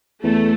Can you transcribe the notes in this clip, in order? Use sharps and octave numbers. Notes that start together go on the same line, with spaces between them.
E2 A3